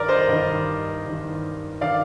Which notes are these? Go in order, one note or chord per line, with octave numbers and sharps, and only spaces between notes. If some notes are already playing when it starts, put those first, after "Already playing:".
Already playing: G2 D#3 A#4 D5
C5 D#5
G2
D#3
G2 D#3
D#3 D5 F5